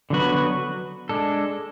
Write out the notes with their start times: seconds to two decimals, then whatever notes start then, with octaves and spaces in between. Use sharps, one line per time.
0.10 D3 F#3 B3 F#4 B4
1.09 G#3 D4 A4